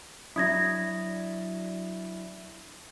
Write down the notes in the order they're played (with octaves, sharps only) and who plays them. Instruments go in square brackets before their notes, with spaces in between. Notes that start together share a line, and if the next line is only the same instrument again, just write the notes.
[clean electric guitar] F#3 D4 E4 [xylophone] D#6 G#6 A#6